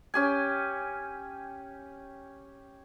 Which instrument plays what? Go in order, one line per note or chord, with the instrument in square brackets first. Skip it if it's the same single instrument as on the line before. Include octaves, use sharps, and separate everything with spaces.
[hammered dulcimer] C#4 G4 G#5